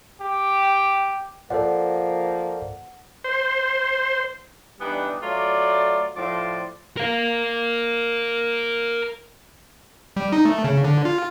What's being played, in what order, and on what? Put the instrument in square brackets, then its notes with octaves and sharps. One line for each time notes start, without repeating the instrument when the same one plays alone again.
[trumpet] G4
[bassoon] F3 [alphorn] A#3 [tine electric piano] A4 C5 D5 [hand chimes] F#5
[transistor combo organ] C5
[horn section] E3 G3 B3 D4 D#4
F#3 A3 F4 D5
A2 F3 D5 C6
[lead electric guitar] A#4 F5
[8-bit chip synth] G3
D#4
A3
C#3
D3
F4